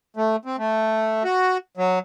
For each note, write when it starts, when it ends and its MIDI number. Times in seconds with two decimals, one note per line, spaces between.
0.17 0.36 57
0.45 0.56 60
0.58 1.23 57
1.24 1.57 66
1.77 1.99 54